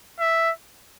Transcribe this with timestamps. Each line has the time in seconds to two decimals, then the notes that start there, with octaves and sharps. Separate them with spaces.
0.20 E5